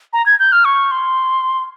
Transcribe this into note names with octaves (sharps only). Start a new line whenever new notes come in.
A#5
G#6
G6
F6
C#6
C6